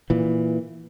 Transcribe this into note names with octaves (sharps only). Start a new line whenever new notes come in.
A#2 E3